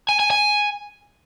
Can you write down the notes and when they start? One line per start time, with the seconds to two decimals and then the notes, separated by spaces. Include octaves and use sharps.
0.09 G#5
0.20 G#5
0.31 G#5